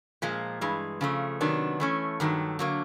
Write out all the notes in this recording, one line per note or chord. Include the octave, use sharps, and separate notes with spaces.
A#2 F3 G#3
G2 E3 G#3
C#3 F3 A3
C3 D#3 F#3 B3 D4
E3 A3 C#4
G2 D#3 F#3 A3
D3 F#3 A#3